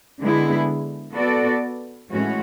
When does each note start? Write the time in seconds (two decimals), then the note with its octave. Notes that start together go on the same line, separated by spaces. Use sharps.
0.20 D3 G#3 B3 E4 G#4
1.15 B3 F#4 A4 D5
2.10 A2 E3 G#3 C#4 F#4